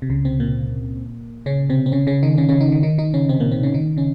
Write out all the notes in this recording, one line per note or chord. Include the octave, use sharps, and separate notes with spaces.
C3
C#2 C#3
C3 C4
A#2 A#3
C#3 C#4
C3 C4
C4
C#3 C#4
C#3 C#4
D#3 D#4
C#3 C#4
C#3 C#4
D#3 D#4
D#3 D#4
D#3 D#4
D#3 D#4
C#3 C#4
C3 C4
A#2 A#3
C3 C4
C#3 C#4
D#3 D#4
C#3 C#4